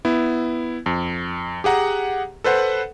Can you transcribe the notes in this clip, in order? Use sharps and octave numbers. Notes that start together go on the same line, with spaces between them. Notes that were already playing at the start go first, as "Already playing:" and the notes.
B3 E4
F2
G4 G#4 F#5 A#5
A4 B4 C5 F#5